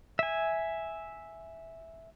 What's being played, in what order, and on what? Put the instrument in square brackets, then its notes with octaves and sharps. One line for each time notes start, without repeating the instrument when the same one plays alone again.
[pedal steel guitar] E5 G#5